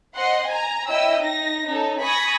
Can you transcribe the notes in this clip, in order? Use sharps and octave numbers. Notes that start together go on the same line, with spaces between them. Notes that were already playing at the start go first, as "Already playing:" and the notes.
C5 D#5 F#5 C6
G#5 A#5
E4 C#5 D#5 E5 G5 E6
D#4 A#6
C#4 D#4 A4
G#5 B5 C#6 D#6 G#6 A#6